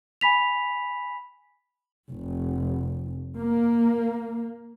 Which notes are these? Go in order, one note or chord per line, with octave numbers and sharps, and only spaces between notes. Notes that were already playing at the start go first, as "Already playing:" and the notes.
G#5 B5 B6 F7
F1
A#3